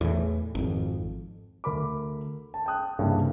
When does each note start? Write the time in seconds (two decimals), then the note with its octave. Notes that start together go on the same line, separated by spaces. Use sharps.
0.01 E2 A2 E3
0.55 G#1 F2
1.64 D2 A#4 B5 D6
2.54 A5
2.66 G5 A5 D#6 F#6
2.99 C2 G2 C#3 E3 A#3